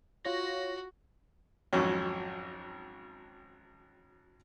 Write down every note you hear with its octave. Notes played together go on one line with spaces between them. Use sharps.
F4 F#4 C#5 A#6
G#1 F2 F#3 C#4